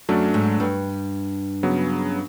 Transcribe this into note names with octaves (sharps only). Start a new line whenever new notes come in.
F#2 F#3 A3 D4
G#2
G2
C#3 F#3 B3